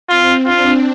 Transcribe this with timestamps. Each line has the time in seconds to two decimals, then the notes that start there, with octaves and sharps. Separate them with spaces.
0.09 C4 F4
0.46 D4 F4